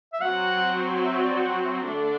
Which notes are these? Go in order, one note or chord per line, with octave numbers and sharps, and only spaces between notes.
E5
F#3 C4 F#4 F#5
E5
D5
F#5
E5
D3 A3 D4 A4 D5 E5
E5